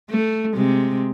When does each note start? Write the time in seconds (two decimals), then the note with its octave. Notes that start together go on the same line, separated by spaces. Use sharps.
0.10 A3
0.55 C3 G#3